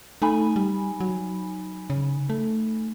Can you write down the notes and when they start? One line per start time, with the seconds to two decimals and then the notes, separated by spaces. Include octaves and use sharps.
0.22 A3 D#4 G#5 B5
0.56 G3
1.00 F#3
1.90 C#3
2.30 A3